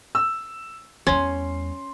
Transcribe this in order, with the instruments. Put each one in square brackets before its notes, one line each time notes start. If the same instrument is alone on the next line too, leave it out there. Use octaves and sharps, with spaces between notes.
[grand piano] E6
[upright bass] E2 G3 [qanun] C#4 [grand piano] C6